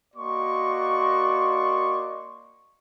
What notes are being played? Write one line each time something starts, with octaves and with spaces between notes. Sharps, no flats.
A#3 F#4 D5 D#5 C6 C#6